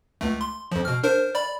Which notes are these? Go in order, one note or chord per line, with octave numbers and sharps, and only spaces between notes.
C#2 A3
C6
F2 F3
B2 F6
D4 A#4 C5
D5 B5